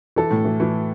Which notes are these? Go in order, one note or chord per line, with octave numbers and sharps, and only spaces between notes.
E3 A4
A2
E3
E3